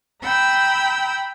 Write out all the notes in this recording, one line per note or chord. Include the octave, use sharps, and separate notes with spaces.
G5 A#5 B5 E6